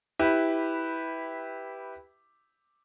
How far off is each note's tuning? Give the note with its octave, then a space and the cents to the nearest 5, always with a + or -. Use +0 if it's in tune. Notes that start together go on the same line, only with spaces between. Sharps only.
E4 -10 G4 +0 B4 +0